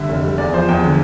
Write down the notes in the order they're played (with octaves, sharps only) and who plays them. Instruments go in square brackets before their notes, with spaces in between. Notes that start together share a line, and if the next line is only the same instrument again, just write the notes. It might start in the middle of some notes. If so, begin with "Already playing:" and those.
Already playing: [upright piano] D3 G3 E5
F1
G3
E2 D5
F3 C5
E2 G5
D3